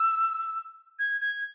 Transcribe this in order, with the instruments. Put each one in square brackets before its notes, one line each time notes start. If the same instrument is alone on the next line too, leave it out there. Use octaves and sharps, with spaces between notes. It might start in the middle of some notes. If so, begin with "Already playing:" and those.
Already playing: [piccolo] E6
G#6
G#6